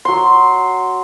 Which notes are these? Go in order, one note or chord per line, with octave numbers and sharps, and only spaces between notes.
F#3 C6